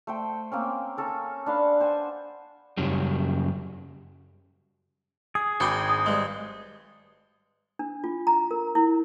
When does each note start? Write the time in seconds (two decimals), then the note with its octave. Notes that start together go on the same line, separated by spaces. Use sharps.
0.07 A3 C5 G5
0.52 A#3 C4 C#4
0.97 C#4 A4 A#4
1.46 D4 B4 F5 C6
1.80 C5 F#5 G#5
2.77 F#2 C#3 F#3 G3
5.35 G#4 D#6
5.60 G#1 D4 F#4 G5 B5 D6
5.89 G#5 D#6
6.06 G2 G#3
7.79 D4
8.04 F4
8.27 A#5
8.51 A#4
8.75 E4